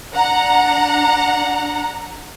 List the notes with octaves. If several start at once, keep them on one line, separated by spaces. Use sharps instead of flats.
D4 F#5 A#5